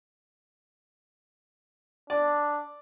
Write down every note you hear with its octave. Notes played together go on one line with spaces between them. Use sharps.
D4 D5